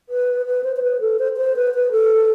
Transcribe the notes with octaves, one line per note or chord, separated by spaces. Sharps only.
B4
B4
C5
C5
B4
A4
C5
C5
B4
B4
A4